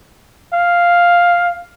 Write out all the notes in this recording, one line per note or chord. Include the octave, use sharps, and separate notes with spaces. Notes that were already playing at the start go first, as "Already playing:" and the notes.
F5